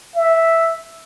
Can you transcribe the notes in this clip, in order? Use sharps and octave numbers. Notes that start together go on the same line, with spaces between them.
E5